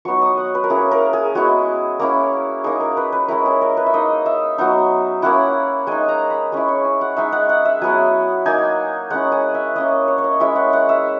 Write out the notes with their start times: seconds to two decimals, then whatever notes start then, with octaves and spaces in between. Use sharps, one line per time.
0.05 F#3 B3 D#4 C#6
0.22 D#6
0.37 F#5
0.55 B4
0.64 A#4
0.70 A#3 C#4 E4 G#4
0.91 A#4
1.13 G#4
1.35 G#3 B3 E4 F#4
1.99 A#3 C#4 E4
2.64 A#3 D#4 G#4
2.80 A#4
2.97 B4
3.12 B4
3.28 G#3 C#4 E4 A#4
3.46 G#4
3.61 A#4
3.77 B4
3.86 E5
3.94 A#3 D#4 D#5
4.26 E5
4.58 F#3 B3 D#4
5.22 A#3 C#4 E4 F#5
5.87 G#3 D#4 G#5
6.09 A#5
6.30 B5
6.52 G#3 C#4 E4
6.69 C#6
6.84 G#5
7.01 F#5
7.16 G#3 D#4 E5
7.32 F#5
7.49 F#5
7.65 E5
7.82 F#3 B3 E4 G#5
8.46 A#3 D#4 G#5
9.10 G#3 C#4 E4 F#5
9.32 G#5
9.54 E5
9.75 A#3 C#4 E4 D#5
10.08 C#5
10.18 C#5
10.24 D#5
10.40 G#3 C#4 E4 E5
10.56 F#5
10.73 F#5
10.89 E5